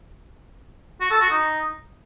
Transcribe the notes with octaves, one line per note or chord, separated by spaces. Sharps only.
F#4
A4
F#4
D#4